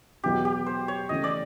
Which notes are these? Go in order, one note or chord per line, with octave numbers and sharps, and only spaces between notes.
E2 B2 F#3 B3 E4 G4
G4
C5
C#5
C#3 E3 A3 C#4 D#5
D5